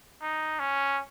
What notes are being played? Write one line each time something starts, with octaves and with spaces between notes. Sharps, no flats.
D#4
C#4